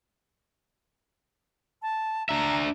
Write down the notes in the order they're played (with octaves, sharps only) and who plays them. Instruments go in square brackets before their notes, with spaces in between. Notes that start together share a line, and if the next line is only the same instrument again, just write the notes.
[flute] A5
[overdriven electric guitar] D4 E5 [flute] A#5